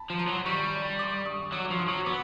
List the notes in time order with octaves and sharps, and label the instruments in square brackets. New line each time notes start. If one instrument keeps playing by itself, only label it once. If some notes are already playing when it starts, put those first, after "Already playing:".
Already playing: [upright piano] A5 B5
[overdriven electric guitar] F3
[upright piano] A#5 C6
[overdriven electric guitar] F#3
[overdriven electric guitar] G3 [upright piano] B5 C#6
[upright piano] C6 D6
C#6 D#6
D#6
[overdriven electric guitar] F#3 [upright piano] D6 E6
[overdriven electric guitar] F3
[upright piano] C#6 D#6
[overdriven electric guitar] F#3
[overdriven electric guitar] B3 [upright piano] D6 E6